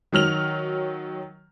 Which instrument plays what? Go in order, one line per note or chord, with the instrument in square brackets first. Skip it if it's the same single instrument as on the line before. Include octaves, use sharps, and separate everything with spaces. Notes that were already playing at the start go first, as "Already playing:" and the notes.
[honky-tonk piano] D#3 F#3 F6 F7